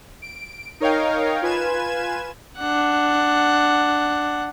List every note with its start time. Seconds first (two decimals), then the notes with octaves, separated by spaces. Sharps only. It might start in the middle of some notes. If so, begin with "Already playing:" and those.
0.22 D7
0.80 D#4 A#4 C#5 D#5 F5 G5
1.42 F4 B4 G#5 G#6 E7
2.58 D4 F#5